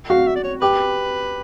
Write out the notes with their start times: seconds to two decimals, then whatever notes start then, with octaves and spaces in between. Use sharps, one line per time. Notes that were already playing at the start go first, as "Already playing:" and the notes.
0.10 F#4 F5
0.27 E5
0.36 D5
0.44 C#5
0.61 G4 B4